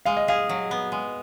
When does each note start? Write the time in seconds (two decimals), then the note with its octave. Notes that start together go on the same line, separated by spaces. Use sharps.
0.05 G#3 F5
0.17 D#5
0.28 G#4 F5
0.49 F#3
0.71 B3
0.92 G#3